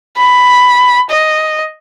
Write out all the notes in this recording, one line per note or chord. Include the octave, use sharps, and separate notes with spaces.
B5
D#5